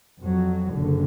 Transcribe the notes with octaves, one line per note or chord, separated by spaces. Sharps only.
F2 F#3
F#1 D3